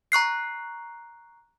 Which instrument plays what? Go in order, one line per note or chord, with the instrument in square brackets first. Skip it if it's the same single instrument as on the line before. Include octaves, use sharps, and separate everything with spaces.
[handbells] A#5 C#6 F#6 C7